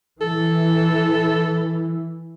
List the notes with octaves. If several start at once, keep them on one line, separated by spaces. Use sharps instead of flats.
E3 A4